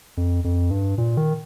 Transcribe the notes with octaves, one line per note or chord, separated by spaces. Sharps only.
F2
F2
G2
A#2
D#3